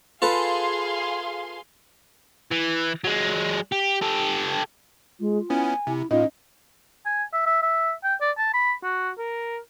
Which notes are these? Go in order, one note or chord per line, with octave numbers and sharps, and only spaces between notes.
F4 G#4 A4 B4 F5 C6
E3
F#3 G#3
G4
G4 A4
G#3 F4
B3 C#4 E4 G#5
C3 E4
A2 C#4 D#4 F4
G#5
E5
E5
E5
G5
D5
A5
B5
F#4
A#4